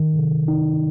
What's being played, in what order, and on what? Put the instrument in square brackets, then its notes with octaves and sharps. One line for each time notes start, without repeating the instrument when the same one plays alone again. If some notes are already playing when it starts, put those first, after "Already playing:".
Already playing: [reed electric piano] D#3
C3
D#4